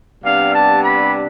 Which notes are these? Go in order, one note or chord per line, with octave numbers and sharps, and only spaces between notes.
C3 G3 B3 D4 F5
A5
B5